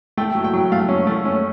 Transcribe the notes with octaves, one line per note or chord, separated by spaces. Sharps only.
A3 G5
F#3
G5
F#3
A3 F5
C#4
A3
C#4